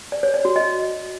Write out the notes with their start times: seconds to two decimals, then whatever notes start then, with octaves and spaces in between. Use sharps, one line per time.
0.12 D5
0.23 C#5
0.34 D5
0.45 F#4
0.56 D#5